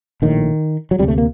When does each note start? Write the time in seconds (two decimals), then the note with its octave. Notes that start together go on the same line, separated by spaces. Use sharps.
0.22 A#1 A2 D#3
0.91 F#3
0.99 D2 C3 G3
1.08 A3
1.18 A#3